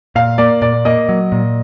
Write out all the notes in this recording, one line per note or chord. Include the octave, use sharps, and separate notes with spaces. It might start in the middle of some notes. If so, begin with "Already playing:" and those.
A#2 F5
A#3 D5
A#2 D5
A#3 D#5
F#3
A#2